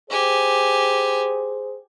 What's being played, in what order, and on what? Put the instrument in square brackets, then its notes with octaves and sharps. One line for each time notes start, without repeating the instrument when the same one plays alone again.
[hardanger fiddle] G4 G#5 [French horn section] G#4 C5